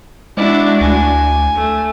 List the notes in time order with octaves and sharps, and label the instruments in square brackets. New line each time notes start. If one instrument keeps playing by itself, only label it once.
[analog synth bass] G#3 [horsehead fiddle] D4 F#4 [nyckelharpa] E4 D5
[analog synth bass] D2 [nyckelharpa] G#5
[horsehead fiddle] A3